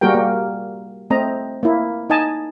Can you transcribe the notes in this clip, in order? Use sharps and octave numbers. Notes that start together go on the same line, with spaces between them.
G3 A#3 F#4 G#4 A#4 G5
A#3
A3 C4 D#5 A#5
A#3 E4
D#4 D#5 G#5 A5